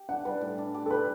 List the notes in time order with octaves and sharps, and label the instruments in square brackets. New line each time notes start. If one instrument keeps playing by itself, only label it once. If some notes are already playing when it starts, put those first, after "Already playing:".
Already playing: [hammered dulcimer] G4
[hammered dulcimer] D4 [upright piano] F#5
[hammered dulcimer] G3 [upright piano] B4
[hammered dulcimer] A2
D4
G4
[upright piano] A4
[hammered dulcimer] G3 [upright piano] B4